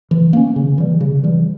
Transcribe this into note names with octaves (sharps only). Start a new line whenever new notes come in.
E3
A#3 C#4
C#3
E3 G3
C#3
E3 G3